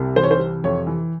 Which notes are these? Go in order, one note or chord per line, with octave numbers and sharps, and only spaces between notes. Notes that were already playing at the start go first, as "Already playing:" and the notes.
Already playing: C2 C3
E3 C5
C#5
C5
C3
F2 C#5
E3